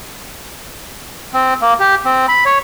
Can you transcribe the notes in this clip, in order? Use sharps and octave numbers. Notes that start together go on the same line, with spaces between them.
C4
A#3
G4
C4
B5
C#5